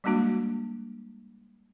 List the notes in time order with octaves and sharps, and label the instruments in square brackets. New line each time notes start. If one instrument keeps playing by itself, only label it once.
[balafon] G3 G#3 A#3 D4 F#4